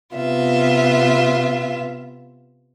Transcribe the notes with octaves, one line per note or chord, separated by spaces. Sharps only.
C3 B3 F4 E5